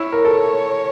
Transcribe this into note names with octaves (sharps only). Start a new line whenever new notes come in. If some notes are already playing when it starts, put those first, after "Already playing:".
Already playing: E4 C#5
A#4
A4